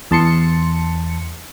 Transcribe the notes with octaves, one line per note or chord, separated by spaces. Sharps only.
E2 A5 C6 C#7